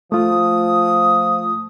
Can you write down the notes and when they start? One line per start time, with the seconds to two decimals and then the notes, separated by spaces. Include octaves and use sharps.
0.12 F3 A3 F4 D#6